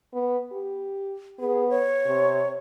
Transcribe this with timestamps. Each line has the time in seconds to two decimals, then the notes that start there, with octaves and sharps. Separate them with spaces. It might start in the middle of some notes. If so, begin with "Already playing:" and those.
0.14 B3
0.52 G4
1.39 B3 G#4
1.69 C#5
2.06 C3